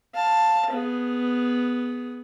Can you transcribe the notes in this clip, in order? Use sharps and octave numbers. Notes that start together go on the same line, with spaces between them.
F5 A5
B3 G#4